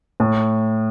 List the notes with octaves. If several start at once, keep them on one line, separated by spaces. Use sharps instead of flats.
A2